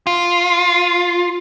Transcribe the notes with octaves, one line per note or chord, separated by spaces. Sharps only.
F4